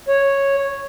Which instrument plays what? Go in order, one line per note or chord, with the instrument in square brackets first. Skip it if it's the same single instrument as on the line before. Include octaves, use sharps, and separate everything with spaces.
[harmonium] C#5